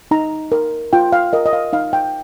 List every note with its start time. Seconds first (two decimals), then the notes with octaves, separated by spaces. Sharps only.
0.11 D#4 A#5
0.52 A#4
0.93 F4 G5
1.13 F5
1.33 A#4 D#5
1.46 D#5
1.53 F5
1.73 D#4 F5
1.93 G5